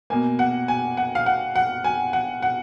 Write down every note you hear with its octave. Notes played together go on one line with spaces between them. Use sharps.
B2 A#3 G#5
F#5
G#5
F#5
F5
F#5
F#5
G#5
F#5
F#5